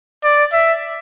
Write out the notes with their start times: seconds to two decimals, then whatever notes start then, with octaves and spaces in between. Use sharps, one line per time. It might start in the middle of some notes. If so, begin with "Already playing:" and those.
0.24 D5
0.53 E5